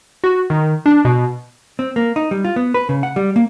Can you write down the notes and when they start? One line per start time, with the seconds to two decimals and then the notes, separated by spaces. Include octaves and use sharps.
0.24 F#4
0.50 D#3
0.86 D4
1.05 B2
1.79 C4
1.96 A#3
2.16 D#4
2.31 G3
2.44 F4
2.56 B3
2.74 B4
2.89 C#3
3.03 F#5
3.16 G3
3.36 A#3